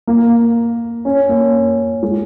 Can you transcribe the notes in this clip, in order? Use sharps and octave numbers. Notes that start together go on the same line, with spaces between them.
A#3
C#4
A#3
G#3